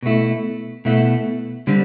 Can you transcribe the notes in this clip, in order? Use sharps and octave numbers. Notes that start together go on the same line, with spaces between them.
B2 A3 E4
B2 A3 E4
D3 G3 C4